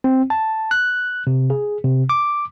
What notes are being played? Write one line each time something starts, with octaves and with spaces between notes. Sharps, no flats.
C4
A5
F#6
C3
G#4
C3
D6